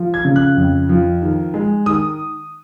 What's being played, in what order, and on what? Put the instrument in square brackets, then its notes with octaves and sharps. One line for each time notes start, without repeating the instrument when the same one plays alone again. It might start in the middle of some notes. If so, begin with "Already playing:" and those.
Already playing: [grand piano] F3
G#6
C#3
F#6
F2
F3
D#3
G#3
D#3 D#6